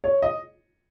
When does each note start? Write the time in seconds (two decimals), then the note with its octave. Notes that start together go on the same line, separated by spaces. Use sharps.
0.04 C#5
0.22 D#5